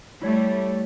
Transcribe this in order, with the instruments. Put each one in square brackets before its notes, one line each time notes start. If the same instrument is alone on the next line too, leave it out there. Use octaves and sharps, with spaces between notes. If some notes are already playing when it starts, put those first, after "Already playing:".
[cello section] G3 A3 [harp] E4 C#5 B6